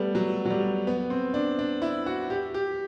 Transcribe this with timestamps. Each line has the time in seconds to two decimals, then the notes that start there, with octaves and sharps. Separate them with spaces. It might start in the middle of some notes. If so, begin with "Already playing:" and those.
Already playing: G3 A3 B3
0.15 F#3
0.45 F#3
0.50 G3
0.87 B3
1.10 C4
1.34 D4
1.59 D4
1.82 E4
2.06 F#4
2.30 G4
2.54 G4